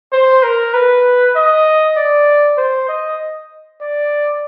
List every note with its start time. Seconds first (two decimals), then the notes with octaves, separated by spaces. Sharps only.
0.12 C5
0.43 A#4
0.74 B4
1.36 D#5
1.97 D5
2.57 C5
2.89 D#5
3.81 D5